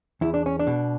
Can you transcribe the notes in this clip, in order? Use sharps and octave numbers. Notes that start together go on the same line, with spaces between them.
E2 E4
D4
C#4
D4
B2